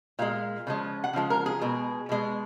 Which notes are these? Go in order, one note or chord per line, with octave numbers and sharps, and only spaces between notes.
A#2 G#3 F5
C#3 F3 G#3
F#5
C#3 F3 G#3
A#4
G#4
B2 G#3
B2 G#3